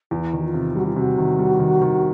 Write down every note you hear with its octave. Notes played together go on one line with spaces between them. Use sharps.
E2 E4
D#3 F#4
F4
C3
G3 F#4
F4
C3 F#4
D#3
G3
D#3
D#3